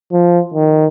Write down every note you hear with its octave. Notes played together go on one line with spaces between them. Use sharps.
F3
D#3